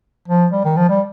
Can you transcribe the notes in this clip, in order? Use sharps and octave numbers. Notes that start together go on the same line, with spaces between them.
F3
G3
D#3
F3
G3